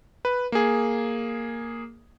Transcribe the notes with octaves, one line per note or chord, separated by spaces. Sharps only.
B4
A#3 G#4